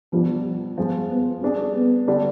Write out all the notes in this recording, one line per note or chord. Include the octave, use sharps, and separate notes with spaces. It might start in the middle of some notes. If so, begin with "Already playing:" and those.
B2 F3 G3 D4
F3 G3 G#3 B3 F4
B3
G3 C4 D4 G#4
B3
D3 G3 D4 G4 D5